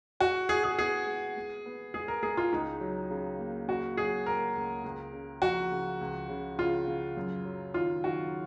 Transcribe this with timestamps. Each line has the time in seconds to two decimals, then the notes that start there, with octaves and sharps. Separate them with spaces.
0.20 G#3 F#4
0.49 G#3 G#4
0.64 G#4
0.78 B3 G#4
1.07 G#3
1.37 G#3
1.66 B3
1.94 G#3 G#4
2.08 A#4
2.23 G#3 G#4
2.37 F4
2.52 C#2 D#4
2.81 F#3
3.10 C#3
3.39 A#3
3.68 C#3 F#4
3.97 F#3 G#4
4.26 A#3 A#4
4.56 C#2
4.84 C#2
5.13 C#3
5.42 F3 F#4
5.72 C#3
6.01 C#2
6.29 C#3
6.58 C#3 F4
6.87 C#3
7.17 F#2
7.45 F#3
7.74 D#3 F4
8.04 D#3 F#4